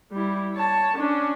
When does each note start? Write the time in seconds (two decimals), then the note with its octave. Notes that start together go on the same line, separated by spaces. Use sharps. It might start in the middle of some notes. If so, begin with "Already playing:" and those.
0.12 G3 E4
0.55 C#5 A5
0.96 C#4 D4